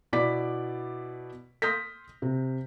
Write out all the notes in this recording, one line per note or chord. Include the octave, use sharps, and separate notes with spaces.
B2 E4 D5 D6 B6
C6 D#6 F6 G6 A#6 B6
C3